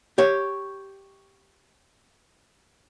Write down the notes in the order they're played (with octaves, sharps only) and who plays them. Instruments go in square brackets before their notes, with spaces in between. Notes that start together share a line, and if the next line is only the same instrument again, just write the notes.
[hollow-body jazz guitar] G4 C#5